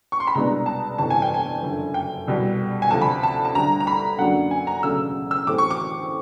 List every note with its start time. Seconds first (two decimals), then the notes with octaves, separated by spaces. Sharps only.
0.12 C#6
0.20 C6
0.27 B5
0.35 C2 B2 G#3 B3 D4 A#5
0.66 A5
0.98 G1 F2 C3 E3 A5
1.10 G#5
1.22 G5
1.34 G#5
1.63 F#1 F2 D3
1.94 G5
2.27 C2 B2 G3
2.82 G#5
2.91 D2 C3 F3 A5
3.01 B5
3.23 A5
3.45 A5
3.55 D2 D3 G3 A#5
3.80 A#5
3.87 B5
4.19 F#2 D3 F#3 A#3 D4 F#5
4.51 G#5
4.67 A#5
4.83 E1 D2 C#3 F#3 A3 E6
5.31 E6
5.47 A2 E3 A3 C4 D6
5.58 C#6
5.71 D6